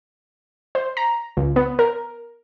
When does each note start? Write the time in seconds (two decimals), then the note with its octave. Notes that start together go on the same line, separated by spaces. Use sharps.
0.75 C5
0.97 A#5
1.37 C#2
1.56 B3
1.79 A#4